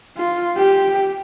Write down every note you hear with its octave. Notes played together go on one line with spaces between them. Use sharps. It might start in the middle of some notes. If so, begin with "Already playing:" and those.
F4
G4